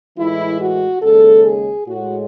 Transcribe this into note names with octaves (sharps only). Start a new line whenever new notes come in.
A2 E3 G#3 E4
F#4
D#2 C#3 G#3 A4
G#4
A2 G#3 F#4